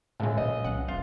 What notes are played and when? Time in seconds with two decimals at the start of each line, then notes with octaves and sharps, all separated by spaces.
0.20 C#2 A2 G#3
0.37 A#2 F#3 D#5
0.64 C2 F#3 C#4 F#5
0.88 D#1 B1 F4